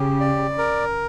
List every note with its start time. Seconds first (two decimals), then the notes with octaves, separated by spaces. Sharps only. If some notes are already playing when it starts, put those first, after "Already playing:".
Already playing: C#3 G4
0.20 D5
0.58 A#4